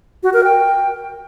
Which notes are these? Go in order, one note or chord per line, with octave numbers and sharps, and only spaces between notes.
F#4
A#4
G5